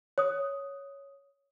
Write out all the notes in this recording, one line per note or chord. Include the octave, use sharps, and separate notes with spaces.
C#5 D#6